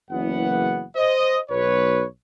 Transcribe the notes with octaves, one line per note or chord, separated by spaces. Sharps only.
F#1 E3 B3 F#5
C5 D#5
B1 B4 C#5